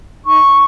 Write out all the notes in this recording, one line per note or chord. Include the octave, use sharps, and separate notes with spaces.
D#4 C#6